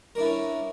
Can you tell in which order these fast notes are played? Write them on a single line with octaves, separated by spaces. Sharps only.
A#4 D4 E4 B4 C#4